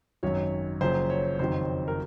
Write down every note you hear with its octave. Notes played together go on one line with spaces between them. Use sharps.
G#1 F#2 D#3 F#3 C#5
F#1 F#2 F3 C5
C#5
F#1 F2 D#3 F#3 C5
A#4